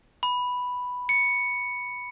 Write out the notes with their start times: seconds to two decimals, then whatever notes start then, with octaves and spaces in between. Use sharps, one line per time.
0.23 B5
1.09 C#7